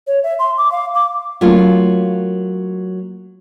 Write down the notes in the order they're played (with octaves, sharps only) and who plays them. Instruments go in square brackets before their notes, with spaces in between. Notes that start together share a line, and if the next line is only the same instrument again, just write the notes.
[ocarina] C#5
E5
C6
D6
F5
D6
[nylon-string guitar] F#3 A3 A#3 C#4 F4